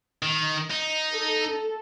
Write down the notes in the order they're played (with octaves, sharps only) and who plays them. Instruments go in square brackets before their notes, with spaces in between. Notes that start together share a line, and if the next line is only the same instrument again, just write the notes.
[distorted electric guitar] D#3
D#4
[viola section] A4